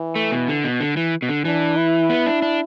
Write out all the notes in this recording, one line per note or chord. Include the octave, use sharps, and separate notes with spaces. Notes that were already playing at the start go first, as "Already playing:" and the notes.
Already playing: E3
A3
B2
D3
B2
D3
E3
B2
D3
E3 D4
E4
B3
D4
D4